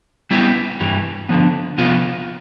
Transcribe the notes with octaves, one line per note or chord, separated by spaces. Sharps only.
G3 B3 E4 G4
G2 E3 G3
D3 F3 B3
C3 F3 B3 F4